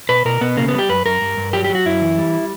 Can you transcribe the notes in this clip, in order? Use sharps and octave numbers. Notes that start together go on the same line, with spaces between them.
B2 B4
B2 A#4
B2 B3
C#3 A#3
B3
G3
G4
F#2 B4
F#2 A#4
G2
G2
F#3 G4
G4
F#3
F#4
F#2 E4
E3
G3